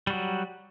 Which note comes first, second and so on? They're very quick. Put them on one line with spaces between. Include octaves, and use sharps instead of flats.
G3 F#4 F#3